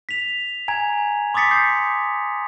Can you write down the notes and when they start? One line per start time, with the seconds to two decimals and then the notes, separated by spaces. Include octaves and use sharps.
0.09 B6 F7
0.68 G#5 A#5 G#6
1.34 C6 D6 D#6 A6 B6 C#7
1.51 G6 A6 C7